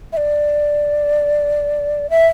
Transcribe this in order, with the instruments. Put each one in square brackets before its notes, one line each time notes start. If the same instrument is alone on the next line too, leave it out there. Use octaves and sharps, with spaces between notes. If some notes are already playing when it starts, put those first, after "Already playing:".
[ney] E5
D5
E5